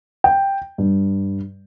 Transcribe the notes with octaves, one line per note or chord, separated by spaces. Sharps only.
G5
G2